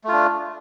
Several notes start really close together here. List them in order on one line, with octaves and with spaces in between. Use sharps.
A3 F4 D4